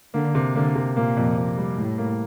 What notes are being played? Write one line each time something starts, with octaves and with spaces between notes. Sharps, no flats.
D3 A#3
C3
D3 A#3
C3
A#2 A#3
F2
F2
G3
A2 G3
A#3